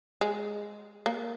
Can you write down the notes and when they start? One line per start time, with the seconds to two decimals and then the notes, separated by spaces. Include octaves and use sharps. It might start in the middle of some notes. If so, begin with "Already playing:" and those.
0.21 G#3
1.06 A#3